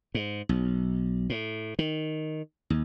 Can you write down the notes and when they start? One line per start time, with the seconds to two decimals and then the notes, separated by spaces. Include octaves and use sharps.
0.15 G#2
0.49 B1
1.30 A2
1.79 D#3
2.70 D#2